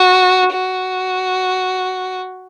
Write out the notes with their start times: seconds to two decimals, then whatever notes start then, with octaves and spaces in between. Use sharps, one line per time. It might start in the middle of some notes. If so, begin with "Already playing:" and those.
Already playing: F#4
0.52 F#4